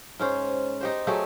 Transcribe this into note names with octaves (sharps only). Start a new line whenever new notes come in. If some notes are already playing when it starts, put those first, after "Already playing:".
G#2 C#4 C5
D#4 G4 C5
F#3 A3 G4 G#4